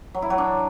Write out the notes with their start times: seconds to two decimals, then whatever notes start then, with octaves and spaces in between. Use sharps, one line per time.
0.14 F#3
0.22 E4
0.30 F#3
0.38 D4